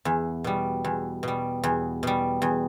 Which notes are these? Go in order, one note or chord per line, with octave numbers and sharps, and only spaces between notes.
E2
B2 G3
E2
B2 G3
E2
B2 G3
E2